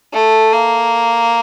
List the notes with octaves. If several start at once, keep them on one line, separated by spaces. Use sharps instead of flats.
A3
A#3